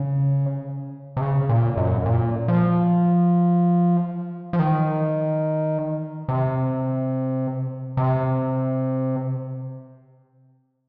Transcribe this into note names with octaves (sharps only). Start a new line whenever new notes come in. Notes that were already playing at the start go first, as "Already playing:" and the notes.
Already playing: C#3
C3
C#3
A#2
F#2
A#2
F3
F3
D#3
C3
C3